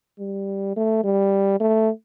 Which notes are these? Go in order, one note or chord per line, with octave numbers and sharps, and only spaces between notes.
G3
A3
G3
A3